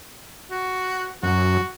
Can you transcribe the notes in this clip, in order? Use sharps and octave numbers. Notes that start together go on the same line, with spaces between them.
F#4
F#2 F#4